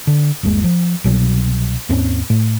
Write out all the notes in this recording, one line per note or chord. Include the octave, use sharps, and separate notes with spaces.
D3
G1 D#2 G#3
F3
C2 B2 F#3
D#2 G#2 C4 C#4
A2